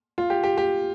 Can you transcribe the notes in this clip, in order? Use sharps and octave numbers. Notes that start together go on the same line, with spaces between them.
F4
G4
G4
G4